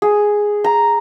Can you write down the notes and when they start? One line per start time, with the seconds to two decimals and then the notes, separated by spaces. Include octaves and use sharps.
0.02 G#4
0.64 A#5